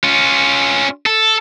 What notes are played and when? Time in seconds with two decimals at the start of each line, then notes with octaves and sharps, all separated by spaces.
0.04 C#4 F4
1.06 A4